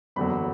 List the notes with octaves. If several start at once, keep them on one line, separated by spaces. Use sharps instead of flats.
F#1 E2 D3 F#3 B5